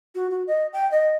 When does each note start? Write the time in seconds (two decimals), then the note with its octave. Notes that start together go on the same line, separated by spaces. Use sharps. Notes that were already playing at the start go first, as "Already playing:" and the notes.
0.15 F#4
0.31 F#4
0.47 D#5
0.73 G5
0.91 D#5